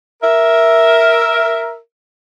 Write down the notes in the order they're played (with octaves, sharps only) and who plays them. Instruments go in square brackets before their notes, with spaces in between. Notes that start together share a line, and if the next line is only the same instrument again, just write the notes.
[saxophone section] A#4 E5